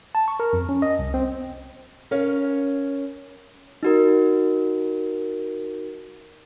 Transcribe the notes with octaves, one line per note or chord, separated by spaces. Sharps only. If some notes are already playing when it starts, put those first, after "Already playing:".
A5
C#6
A#4
F2
C#4
D#5
C2
C4
C#4 A#4 C#5 F5
D#4 F#4 A#4